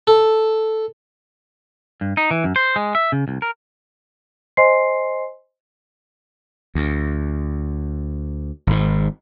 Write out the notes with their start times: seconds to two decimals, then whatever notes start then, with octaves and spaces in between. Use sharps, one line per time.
0.07 A4
2.01 G2
2.17 D#4
2.31 E3
2.44 F#2
2.56 C5
2.76 G#3
2.95 E5
3.12 C#3
3.28 C2
3.42 A#4
4.57 C5 D#5 G#5 C6 C7
6.75 D2
8.67 G#1 G#2